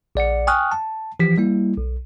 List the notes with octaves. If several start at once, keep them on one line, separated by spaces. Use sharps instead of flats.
A#1 D5 F#5 C#7
G5 G#5 C#6 D#6 F6 F#6
A5
E3 F3 G4 B6
G3 A#3 E4
B1